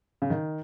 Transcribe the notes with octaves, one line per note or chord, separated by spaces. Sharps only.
C#3
D#3